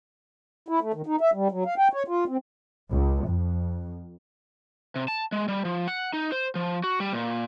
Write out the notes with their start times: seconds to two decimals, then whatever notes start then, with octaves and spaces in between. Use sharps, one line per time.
0.68 E4
0.82 A3
0.94 D#3
1.06 D#4
1.21 E5
1.33 G3
1.51 F#3
1.66 F5
1.78 G5
1.93 C#5
2.08 F4
2.28 C4
2.90 C#2
3.24 F2
4.96 C3
5.08 A5
5.32 G#3
5.48 G3
5.65 F3
5.88 F#5
6.13 D#4
6.32 C5
6.55 F3
6.84 F#4
7.00 G3
7.13 A#2